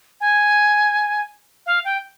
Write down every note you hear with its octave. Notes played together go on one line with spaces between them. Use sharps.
G#5
F5
G5